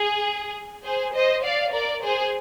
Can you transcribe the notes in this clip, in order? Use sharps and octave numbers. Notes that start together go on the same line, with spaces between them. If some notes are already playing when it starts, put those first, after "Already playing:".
Already playing: G#4
G#4 C5
C5 D#5
D5 F5
A#4 D5
G#4 C5